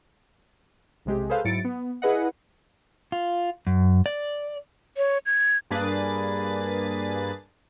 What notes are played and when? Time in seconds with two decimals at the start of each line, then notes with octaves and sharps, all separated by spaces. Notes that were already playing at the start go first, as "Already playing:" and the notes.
1.05 B1 C3 G#3 G4
1.29 G#4 A4 B4 C5 F5
1.45 G#2 F#3 E4 A6 C#7 D7
1.65 B3
2.02 E4 G#4 B4 D#5 F#5
3.12 F4
3.67 F#2
4.06 D5
4.97 C#5
5.26 G#6
5.71 G2 A#3 D4 G#4 B4 A6